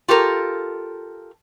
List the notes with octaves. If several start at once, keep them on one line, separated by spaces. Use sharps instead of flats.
F4 G4 A4 A#4